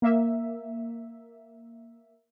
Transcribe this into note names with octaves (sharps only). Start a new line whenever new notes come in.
A#3 E5